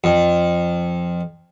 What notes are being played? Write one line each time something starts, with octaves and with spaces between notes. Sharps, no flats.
F2